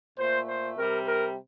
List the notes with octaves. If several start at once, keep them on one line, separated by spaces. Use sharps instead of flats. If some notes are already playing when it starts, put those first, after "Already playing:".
A#2 A3 C5
C5
C3 G3 A#4
A#4